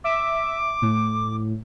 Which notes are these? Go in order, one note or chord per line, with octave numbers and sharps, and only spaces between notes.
E5 D6
A2